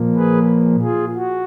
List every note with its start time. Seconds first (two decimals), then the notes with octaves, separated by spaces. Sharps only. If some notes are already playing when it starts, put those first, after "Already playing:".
Already playing: A#2 F3 A#3
0.16 G#4 B4
0.82 F4 G#4
1.16 F#4